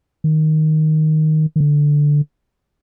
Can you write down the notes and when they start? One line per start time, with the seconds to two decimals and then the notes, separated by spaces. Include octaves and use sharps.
0.24 D#3
1.56 D#3
1.60 D3